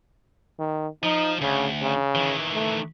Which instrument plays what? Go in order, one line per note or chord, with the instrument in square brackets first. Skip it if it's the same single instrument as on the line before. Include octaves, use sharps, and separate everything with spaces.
[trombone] D#3
[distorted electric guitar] F3 [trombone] D#4
[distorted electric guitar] D2 [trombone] C#3
[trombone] C#3
[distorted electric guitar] D#3 E3
[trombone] A3